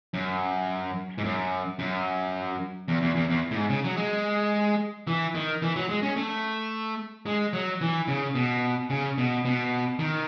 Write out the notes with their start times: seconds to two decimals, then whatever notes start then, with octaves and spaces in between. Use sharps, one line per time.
0.14 F#2
1.18 G#2
1.24 F#2
1.79 F#2
2.88 E2
3.02 E2
3.15 E2
3.29 E2
3.51 A2
3.56 G#2
3.69 C#3
3.84 F#3
3.97 G#3
5.07 E3
5.35 D#3
5.62 E3
5.76 F#3
5.89 G#3
6.03 C#4
6.16 A3
7.26 G#3
7.53 F#3
7.81 E3
8.08 C#3
8.35 B2
8.90 C#3
9.18 B2
9.45 B2
9.99 D#3